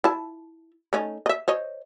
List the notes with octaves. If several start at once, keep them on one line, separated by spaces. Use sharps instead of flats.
E4 A5
A3 C#4 D#4
D#5 E5
C5 C#5 D#5